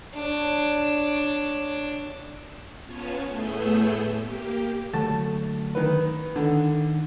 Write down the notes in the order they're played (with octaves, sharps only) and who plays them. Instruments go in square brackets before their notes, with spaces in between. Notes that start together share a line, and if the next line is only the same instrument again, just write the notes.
[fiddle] D4 C#5
[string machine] B3 C#4 F4 C#5 G#5 A5
A2 A3 B3 G#4 E6 G6
A#3 G4
[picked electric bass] D3 F#3 A3 [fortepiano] A5
[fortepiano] D#3 B4
[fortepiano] D3 [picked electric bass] D#3